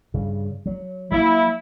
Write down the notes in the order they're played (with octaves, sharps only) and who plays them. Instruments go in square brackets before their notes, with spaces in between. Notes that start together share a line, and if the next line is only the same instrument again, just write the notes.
[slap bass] G2 C#3
F#3
[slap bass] F#3 A#3 [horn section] E4